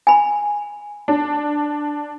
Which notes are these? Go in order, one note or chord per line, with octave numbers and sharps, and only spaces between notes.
G#5 B5
D4